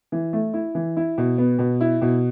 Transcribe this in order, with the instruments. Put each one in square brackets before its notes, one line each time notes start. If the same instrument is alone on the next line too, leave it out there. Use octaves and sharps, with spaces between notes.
[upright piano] E3
A3
E4
E3
E4
B2
B3
B2
E4
B2